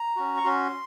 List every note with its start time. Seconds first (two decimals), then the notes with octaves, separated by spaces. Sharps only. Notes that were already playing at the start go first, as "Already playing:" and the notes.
Already playing: A#5
0.16 C#4 F#4
0.37 C#6
0.44 C#4 F#4 C6